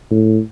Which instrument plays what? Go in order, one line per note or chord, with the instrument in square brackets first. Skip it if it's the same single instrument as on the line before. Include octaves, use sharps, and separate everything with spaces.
[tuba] A2